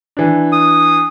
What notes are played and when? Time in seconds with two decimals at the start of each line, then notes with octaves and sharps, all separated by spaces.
0.17 E3 D4
0.53 D#6